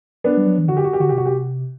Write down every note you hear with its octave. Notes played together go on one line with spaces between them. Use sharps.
B3 D4
G3
F#3
E3
D3 F#4
G4
F#4
G4
D3 F#4
C3 G4
F#4
G4